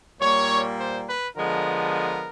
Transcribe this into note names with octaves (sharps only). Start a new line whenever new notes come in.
A#2 G3 A#3 C#5
C5
B4
D3 F3 G#3 B3 A#4